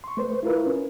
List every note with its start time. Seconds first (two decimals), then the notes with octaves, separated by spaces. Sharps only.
0.04 C6 C#6
0.17 A3 B4 C5
0.43 E4 F4 A#4 B4
0.67 C#4